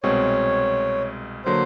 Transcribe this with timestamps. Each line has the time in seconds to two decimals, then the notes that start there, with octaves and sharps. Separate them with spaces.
0.03 C2 B2 G#3 C4 C#5
1.45 D3 F#3 A#3 C5